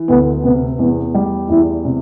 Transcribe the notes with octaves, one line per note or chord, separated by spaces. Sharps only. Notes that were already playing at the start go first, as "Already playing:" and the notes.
Already playing: E3
D2 B3
C3 B3
E2 B3
G3
E2 E4
C3